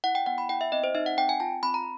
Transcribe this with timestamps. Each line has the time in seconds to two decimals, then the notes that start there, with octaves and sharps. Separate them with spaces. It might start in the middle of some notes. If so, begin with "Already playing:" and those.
0.04 E4 F#5
0.15 G5
0.26 B3 F#5
0.38 B5
0.49 E4 G5
0.61 E5
0.72 C4 D#5
0.84 C5
0.95 D#4 E5
1.06 F#5
1.17 C4 G5
1.29 G#5
1.40 F4 A5
1.63 C4 B5
1.74 A#5